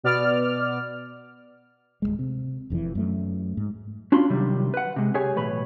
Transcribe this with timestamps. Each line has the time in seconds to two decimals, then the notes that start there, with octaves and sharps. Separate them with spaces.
0.03 B2 B3 D5 F6
2.02 D1 B1 G#3
2.19 C3
2.70 E1 F2 C3 E3
2.95 F#2 A3
3.57 G#2
4.12 C#4 D4 F4 F#4 B5 C6
4.30 C3 D#3 F#3 G3
4.74 B4 F#5
4.96 C3 G#3
5.14 C2 G4 G#4 C#5 G#5
5.36 B1 A2 E3 B4 C#5 B5